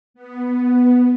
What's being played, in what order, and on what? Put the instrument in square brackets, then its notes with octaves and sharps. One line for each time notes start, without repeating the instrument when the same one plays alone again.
[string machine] B3